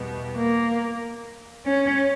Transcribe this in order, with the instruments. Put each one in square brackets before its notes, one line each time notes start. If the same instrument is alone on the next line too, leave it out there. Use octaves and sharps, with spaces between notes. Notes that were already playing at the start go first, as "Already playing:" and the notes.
Already playing: [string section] E2 B2 G3 B3
[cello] A#3
C#4